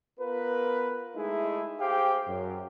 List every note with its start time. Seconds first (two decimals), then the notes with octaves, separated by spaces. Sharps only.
0.19 B3 F4 A#4 B4
1.16 G#3 A3 D#4 E4 G#4 E5
1.80 G4 G#4 C5 F5 G5
2.27 F#2